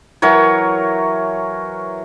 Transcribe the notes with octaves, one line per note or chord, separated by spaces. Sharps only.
E3 F#3 A#4 C#5